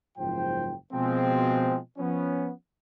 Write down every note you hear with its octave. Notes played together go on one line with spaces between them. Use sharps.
F#1 G#2 F3 C5 G5
B2 F3 G#3 C4
F3 B3 C#4